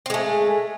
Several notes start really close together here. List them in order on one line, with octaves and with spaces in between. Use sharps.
C4 G#3 A3